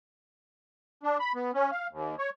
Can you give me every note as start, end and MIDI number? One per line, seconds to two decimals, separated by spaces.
1.03 1.18 62
1.20 1.33 83
1.35 1.51 59
1.54 1.71 61
1.72 1.87 77
1.91 2.15 39
2.19 2.30 73